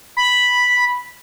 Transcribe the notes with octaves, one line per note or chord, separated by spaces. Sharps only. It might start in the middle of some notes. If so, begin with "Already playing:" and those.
B5